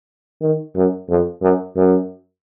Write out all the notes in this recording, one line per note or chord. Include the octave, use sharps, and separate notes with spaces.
D#3
F#2
F2
F#2
F#2